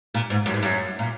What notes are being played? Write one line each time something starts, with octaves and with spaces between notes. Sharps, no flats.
A#2
G#2
F#2
G#2
F#2
A#2